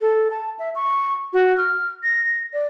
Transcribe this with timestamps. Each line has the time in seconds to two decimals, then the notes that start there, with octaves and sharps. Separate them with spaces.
0.01 A4
0.31 A5
0.59 E5
0.75 C#6
1.33 F#4
1.57 F6
2.03 A#6
2.53 D5